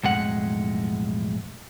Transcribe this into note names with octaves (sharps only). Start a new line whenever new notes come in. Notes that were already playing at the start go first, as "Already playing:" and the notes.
B1 F2 A2 G#3 F#5